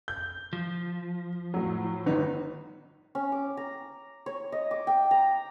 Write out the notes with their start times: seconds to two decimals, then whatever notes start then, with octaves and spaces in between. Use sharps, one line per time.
0.08 G6
0.53 F3
1.54 A2 F#3
2.06 G1 D#3 B3 D#4
3.15 C#4
3.32 D6
3.57 A#5
4.26 C#5
4.52 D#5
4.71 D6
4.87 G5
5.11 A#5